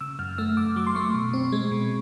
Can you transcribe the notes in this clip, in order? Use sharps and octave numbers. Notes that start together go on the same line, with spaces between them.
C#3 E6
F#2 F6
A3 E6
F#2 D6
F#3 D6
C6
A3 C#6
B2
C4
G#3
B2